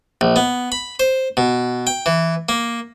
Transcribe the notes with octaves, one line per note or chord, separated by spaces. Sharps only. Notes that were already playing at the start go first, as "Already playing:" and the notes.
A#1
B3
B5
C5
B2
G5
E3
A#3